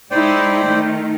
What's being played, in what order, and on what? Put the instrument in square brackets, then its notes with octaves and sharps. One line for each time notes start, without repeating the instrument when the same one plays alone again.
[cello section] G#3 D#4 E4 [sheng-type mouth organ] C5 D5 G5
[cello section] D#3 A3